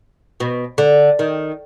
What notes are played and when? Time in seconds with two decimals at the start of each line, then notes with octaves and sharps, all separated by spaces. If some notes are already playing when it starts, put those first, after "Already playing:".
0.40 B2
0.78 D3
1.19 D#3